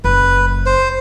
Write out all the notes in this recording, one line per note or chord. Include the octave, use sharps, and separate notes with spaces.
F#1 B4
C5